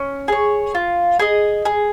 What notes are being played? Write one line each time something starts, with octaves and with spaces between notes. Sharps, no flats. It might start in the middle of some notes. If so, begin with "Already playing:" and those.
Already playing: C#4
G#4 C#5
F4
G#4 D#5
G#4